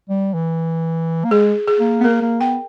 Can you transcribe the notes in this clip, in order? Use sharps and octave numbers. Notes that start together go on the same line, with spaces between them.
G3
E3
A#3
G#3 G#4
G#4
A#3
B3
A#3 A#4
A#3
B3 G5